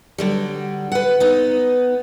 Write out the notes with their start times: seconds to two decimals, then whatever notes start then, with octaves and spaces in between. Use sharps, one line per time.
0.18 D3 F#3 G3
0.92 B4 F#5
1.20 B3 D#4